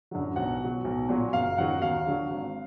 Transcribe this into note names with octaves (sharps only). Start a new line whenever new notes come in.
F#2 D3 F#3
B1 F#5
B2 F#3
B1
A#2 F#3
F#1 F5
F#2 D#3 F#3 F#5
D#2 F5
D3 F#3
G#1